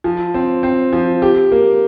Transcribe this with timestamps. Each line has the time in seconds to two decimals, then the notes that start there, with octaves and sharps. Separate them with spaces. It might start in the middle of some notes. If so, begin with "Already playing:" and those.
0.04 F3
0.34 C4
0.63 C4
0.93 F3
1.22 G4
1.52 A#3